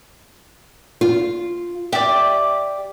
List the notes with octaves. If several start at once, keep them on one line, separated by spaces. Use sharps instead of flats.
F4
G4 D5 E5